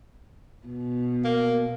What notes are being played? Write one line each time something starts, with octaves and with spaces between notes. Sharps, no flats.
B2
A#3